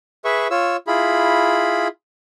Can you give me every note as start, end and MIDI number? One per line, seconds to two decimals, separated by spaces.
0.25 0.48 68
0.25 0.48 71
0.25 0.48 76
0.25 0.48 85
0.51 0.77 65
0.51 0.77 73
0.51 0.77 88
0.87 1.88 64
0.87 1.88 65
0.87 1.88 68
0.87 1.88 83